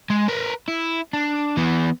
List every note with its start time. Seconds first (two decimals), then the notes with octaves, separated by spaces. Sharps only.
0.10 G#3
0.28 A#4 B4
0.68 E4
1.13 D4
1.57 E3 B3